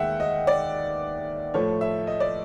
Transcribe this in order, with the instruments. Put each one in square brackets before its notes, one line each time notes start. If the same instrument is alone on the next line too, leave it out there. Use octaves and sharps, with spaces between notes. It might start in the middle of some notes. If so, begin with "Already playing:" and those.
Already playing: [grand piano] D#2 D#3 G#3 E5 F#5 G5
D#5
D5
A2 F3 A3 C#5
E5
D#5
D5